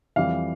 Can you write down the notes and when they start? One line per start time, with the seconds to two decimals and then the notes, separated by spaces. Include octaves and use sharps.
0.16 F2 E3 G3 F5